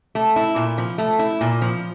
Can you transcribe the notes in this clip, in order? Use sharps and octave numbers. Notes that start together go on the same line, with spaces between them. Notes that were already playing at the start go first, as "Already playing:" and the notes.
A3
E4
A#2
F3
A3
E4
A#2
F3